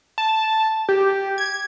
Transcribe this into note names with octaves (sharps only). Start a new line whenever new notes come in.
A5
G4
G#6